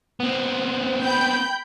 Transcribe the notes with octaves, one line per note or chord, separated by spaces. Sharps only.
B3 C4
G5 B5 G6